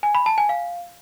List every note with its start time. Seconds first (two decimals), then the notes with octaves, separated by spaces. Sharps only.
0.03 G#5
0.15 B5
0.26 A5
0.38 G#5
0.49 F5